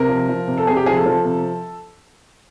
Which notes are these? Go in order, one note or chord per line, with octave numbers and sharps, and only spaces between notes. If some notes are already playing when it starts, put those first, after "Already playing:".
Already playing: C3 A#4
F3
F3
C3
A4
C3 G#4
G4
F3 G#4
A4
F3
C3